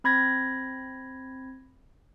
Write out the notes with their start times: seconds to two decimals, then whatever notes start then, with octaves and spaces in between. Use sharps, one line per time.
0.04 C4 B5 G#6 A#6